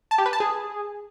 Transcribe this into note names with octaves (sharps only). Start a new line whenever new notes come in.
A5
G4
B4
A5
G#4